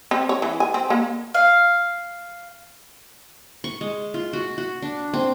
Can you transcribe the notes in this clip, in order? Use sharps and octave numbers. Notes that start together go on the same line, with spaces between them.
C4
C#5
E3
G#5
C4
A#3
F5
C#6
G#3
F4
F#4
F#4
D4
C4